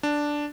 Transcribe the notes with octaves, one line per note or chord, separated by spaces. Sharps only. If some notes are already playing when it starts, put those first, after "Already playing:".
D4